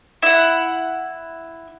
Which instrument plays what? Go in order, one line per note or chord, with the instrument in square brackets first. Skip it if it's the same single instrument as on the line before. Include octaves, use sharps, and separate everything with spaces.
[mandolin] E4 F#5